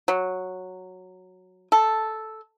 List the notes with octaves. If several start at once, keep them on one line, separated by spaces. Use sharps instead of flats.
F#3
A4